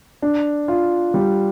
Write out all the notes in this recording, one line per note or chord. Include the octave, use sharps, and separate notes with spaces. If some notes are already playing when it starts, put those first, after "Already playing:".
D4
F4
G3